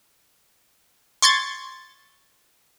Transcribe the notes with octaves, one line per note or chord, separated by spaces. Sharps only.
C6 C#6 G#6 A6